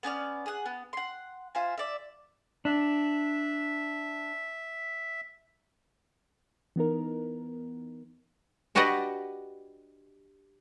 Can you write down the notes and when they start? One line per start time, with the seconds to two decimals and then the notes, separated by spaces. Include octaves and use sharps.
0.03 B3 C#4 D5 F6
0.46 G#4 F#5
0.66 B3
0.93 F#5 C6
1.55 F4 C5 E5 G#5
1.78 D5 E5
2.65 D4 E5
6.76 E3 B3 D#4 A#4
8.75 D4 F#4 G4 B4 D5 D#5